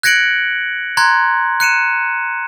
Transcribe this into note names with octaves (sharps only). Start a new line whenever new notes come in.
F#6 G#6 A#6 C#7 D7 F#7
A#5 C6 F#6 G#6
F#6 C#7 D#7 E7